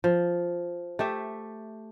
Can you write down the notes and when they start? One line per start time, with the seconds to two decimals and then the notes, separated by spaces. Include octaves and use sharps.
0.04 F3
0.99 A3 G4 E5